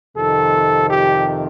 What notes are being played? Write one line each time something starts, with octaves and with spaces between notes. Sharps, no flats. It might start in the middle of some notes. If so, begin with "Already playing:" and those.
F2 C3 D#3 A4
G4